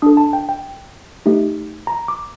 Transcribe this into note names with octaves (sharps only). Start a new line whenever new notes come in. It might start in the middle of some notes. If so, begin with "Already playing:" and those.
D4 A4 D#6
A5
G5
G5
A3 D#4 G4
A#5
D6